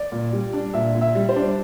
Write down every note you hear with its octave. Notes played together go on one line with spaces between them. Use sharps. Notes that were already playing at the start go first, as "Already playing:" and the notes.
Already playing: D5
A#2
G3
D4
A#2 E5
A#2
E5
G3
C5
D4